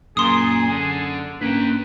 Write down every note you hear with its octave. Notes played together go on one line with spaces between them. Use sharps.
F#2 A#2 G#4 C6 D#6
D3
G#2 A#3 C#4 D4 B4 G5